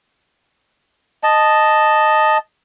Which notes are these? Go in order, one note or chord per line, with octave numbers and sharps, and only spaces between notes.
D#5 A5